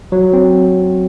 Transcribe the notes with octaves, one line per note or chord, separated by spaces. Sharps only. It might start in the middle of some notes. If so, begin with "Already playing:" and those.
F#3
C4